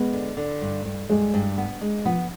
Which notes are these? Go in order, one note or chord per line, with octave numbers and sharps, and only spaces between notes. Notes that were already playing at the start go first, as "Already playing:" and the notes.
Already playing: G#3 B3
D3
D3
G2
G2
G2 G#3
G2
B3
G#3
F3 B3